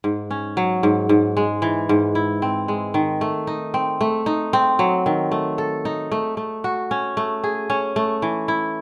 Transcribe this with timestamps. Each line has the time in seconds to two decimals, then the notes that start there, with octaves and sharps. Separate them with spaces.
0.04 G#2
0.31 C#4
0.57 F#3
0.83 G#2
1.09 G#2
1.37 G#3
1.62 E3
1.89 G#2
2.15 E4
2.42 C4
2.68 G#3
2.94 D#3
3.21 A3
3.47 D#4
3.74 C4
4.01 A3
4.26 D#4
4.53 C4
4.79 F#3
5.06 D#3
5.32 A3
5.58 A4
5.85 D#4
6.12 A3
6.37 A3
6.64 F#4
6.91 C#4
7.17 A3
7.44 G#4
7.70 C#4
7.96 A3
8.22 E3
8.48 E4